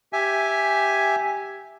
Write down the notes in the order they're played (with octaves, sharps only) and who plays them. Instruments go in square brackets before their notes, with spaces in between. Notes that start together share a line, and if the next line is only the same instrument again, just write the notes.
[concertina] G4 E5 G#5